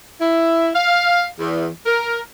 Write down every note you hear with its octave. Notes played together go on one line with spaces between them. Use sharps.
E4
F5
E2
A#4